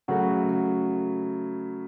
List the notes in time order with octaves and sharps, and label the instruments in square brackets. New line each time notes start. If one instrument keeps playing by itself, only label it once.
[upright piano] C#3 F#3 A3 F#4